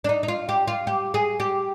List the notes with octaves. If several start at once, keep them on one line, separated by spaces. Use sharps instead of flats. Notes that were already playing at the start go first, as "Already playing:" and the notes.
D4
D#4
D#4
F4
G4
F4
G4
G#4
G4